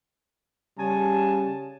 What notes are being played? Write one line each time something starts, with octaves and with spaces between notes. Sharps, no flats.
C#3 G3 G#5 A5